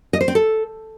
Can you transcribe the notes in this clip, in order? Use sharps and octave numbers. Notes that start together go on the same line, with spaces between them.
D#5
C5
C4
A4